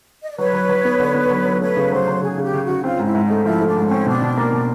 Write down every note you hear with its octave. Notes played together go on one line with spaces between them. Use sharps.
D#5
D5
F#3 B4 C#5
F#3
F#3
B3
D3
B3
F#3
F#3
A3 B4 C#5
C#3
F#3 C5
F#3
C#3 G#4
C#3 G4
C#3
F#4
C#3
C4 F4
G#2 E4
G#2
D#4
A3
F3 E4
A3
D4
G#2
C4 C#4
B2 D4
B2
A#3
B2